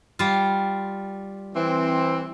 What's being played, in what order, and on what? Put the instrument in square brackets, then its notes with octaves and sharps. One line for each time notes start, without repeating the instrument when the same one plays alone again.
[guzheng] G3 F4
[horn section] E3 C4